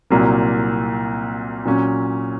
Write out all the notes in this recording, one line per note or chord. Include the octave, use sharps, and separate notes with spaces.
C2 A#2 F#3 A#3
A#2 F#3 C#4